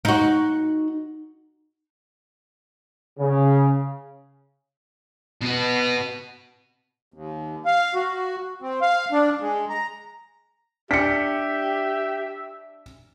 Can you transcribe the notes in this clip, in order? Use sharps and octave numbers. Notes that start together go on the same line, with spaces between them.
D#4 F#4
C#3
B2 B3
D#2
F5
F#4
C4
F5
D4
G#3
A#5
D4 G4 E5 B6 C#7